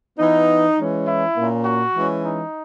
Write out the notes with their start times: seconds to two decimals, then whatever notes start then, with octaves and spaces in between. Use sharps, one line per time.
0.18 E3 B3 D#4
0.77 E3 G#3 C#4
1.07 E4
1.36 A#2 A#3 C#4
1.65 F#4
1.94 E3 G#3 C#4
2.24 D#4